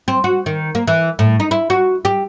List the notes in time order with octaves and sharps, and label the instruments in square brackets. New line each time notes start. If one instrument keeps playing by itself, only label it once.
[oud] C4
F#4
D#3
A#3
E3
A2
D#4
E4
F#4
G4